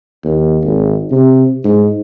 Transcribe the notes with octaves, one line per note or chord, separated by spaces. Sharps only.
D#2
G#1
C3
G#2